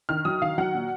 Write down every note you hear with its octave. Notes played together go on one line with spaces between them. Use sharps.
D#3 F6
F#3 D#6
D#3 F5
F#3 F#5
A#2